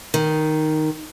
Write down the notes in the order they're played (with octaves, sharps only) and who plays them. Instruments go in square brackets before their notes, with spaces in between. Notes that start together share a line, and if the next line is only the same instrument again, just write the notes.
[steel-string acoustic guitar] D#3